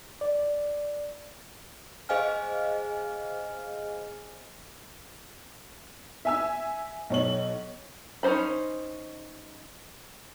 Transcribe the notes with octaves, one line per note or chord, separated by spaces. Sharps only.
D5
G#4 C5 D#5 F5 G#5 F6
E5 G#5 E6
B1 C#5 F#7
C#4 D#4 F4 C5 B5